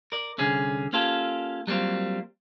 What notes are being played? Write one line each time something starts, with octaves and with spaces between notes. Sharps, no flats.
A#4 D5
C2 D3 C#4 G#4
A#3 C#4 F4 G4 A4
F#3 G3 A#3 C4 F4